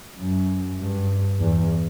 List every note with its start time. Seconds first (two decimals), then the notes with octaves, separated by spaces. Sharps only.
0.19 F#2
0.80 G2
1.40 E2